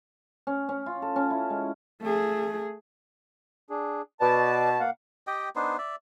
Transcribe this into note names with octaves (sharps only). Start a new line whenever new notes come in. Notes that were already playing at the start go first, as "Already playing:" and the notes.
C#4
C#4
F4
A4
C#4
E4
G#3
A3 G#4
D4 G#4
B2 B4 D5 A5
A#3 F5 F#5
G4 D#5 G5
B3 D4 D#4 C5
D5 E5